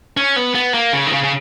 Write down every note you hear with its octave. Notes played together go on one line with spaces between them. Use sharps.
C#4
B3
B3
A#3
C#3
D#3
C#3
C#3